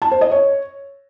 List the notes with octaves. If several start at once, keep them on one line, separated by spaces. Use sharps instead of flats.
A5
C5
D#5
C#5